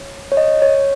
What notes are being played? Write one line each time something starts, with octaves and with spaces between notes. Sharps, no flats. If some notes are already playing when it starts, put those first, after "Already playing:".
Already playing: C#5
C#5
D#5
C#5